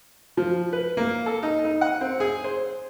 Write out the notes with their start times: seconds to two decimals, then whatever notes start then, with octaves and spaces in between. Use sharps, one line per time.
0.37 F3
0.73 B4
0.97 A#3
1.26 A4
1.43 D#4
1.65 D#4
1.81 F#5
2.01 C4
2.20 G#4
2.44 C5